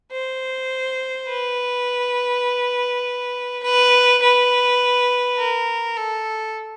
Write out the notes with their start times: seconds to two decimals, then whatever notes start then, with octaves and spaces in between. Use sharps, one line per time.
0.12 C5
1.29 B4
3.63 B4
4.22 B4
5.38 A#4
5.97 A4